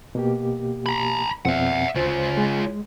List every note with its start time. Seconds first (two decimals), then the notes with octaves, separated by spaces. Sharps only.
0.15 B2 A#3 G4
0.86 A#5 B5
1.45 F2 B2 C4 E5 F#5
1.95 D2 C#3 F4 C5
2.37 G#3